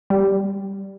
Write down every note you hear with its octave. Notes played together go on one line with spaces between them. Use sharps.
G3